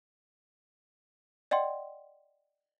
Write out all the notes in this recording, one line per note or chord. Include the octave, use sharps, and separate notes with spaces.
D5 D#5 F#5 G5 C6